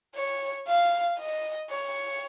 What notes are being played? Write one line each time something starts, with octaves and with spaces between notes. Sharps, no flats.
C#5
F5
D#5
C#5